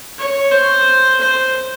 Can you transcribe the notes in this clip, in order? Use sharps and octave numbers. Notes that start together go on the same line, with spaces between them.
C#5
C5
C5